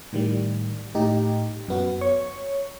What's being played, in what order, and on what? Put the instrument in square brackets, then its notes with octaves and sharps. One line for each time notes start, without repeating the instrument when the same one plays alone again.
[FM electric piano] A2 D#3 G3
A2 D#4 G4
F#2 B3 F#4
C#5 C#6